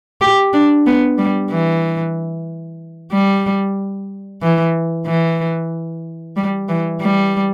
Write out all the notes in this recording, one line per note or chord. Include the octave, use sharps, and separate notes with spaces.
G4
D4
B3
G3
E3
G3
E3
E3
G3
E3
G3